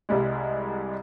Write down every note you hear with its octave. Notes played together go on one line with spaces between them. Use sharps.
C2 G3 G#3